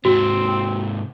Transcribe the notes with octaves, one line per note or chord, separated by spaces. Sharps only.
G#2 C3 C4 F#4